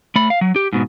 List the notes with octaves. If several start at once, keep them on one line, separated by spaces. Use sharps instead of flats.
A3 B5
F5
F#3
G4
G#2 B2